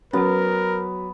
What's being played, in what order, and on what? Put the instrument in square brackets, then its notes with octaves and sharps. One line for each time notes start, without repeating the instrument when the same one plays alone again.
[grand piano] F#3 [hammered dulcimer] B3 [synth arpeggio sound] C#4 F#4 [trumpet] A#4